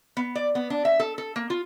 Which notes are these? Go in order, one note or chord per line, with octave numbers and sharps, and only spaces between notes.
B3
D5
B3
D4
E5
A4
A4
A#3
F4